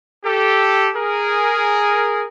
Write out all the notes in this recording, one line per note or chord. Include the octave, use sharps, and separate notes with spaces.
G4 A4
G#4 A#4